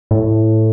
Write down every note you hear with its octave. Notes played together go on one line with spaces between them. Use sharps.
A2